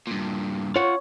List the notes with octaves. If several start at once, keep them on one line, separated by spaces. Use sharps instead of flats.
G2 A#2
F4 C#5 F#5